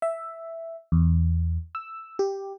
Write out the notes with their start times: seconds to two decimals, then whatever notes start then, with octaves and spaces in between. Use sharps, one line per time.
0.02 E5
0.92 E2
1.75 E6
2.19 G4